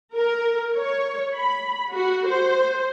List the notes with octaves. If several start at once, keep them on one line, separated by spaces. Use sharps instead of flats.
A#4
C#5
B5
F#4
C5